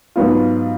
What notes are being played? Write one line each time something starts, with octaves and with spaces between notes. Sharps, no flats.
G#2 F#3 B3 F4